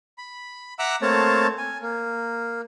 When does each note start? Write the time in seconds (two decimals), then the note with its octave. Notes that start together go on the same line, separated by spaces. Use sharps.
0.18 B5
0.79 E5 F#5 A#5 D6 E6 F#6
1.02 A3 A#3 C4 C#5 A5
1.58 G#5
1.82 A#3